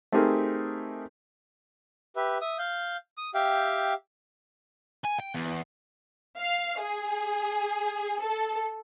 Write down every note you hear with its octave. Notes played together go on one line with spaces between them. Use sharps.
A3 C4 D#4 G4 G#4 A#4
G4 B4 E5
E5 D#6
F5 G6
D#6
G4 E5 F5 G5
G#5
G5
E2
F5
G#4
A4